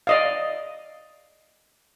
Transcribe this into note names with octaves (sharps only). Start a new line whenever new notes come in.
D5 D#5 F5